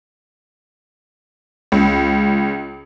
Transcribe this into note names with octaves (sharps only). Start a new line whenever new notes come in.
C#2